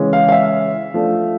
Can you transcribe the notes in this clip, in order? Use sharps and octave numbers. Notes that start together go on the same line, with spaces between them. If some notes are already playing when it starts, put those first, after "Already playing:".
Already playing: C#3 E3 G#3 C#4
F5
F5
E5
F3 A3 D4